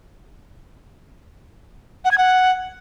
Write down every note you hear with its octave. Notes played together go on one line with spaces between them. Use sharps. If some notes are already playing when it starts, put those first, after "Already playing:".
F#5
G#6
F#5